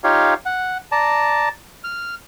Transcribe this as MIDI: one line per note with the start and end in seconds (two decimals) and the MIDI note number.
0.04 0.34 63
0.04 0.34 65
0.04 0.34 67
0.04 0.34 73
0.04 0.34 77
0.46 0.78 78
0.92 1.49 74
0.92 1.49 81
0.92 1.49 82
1.84 2.15 89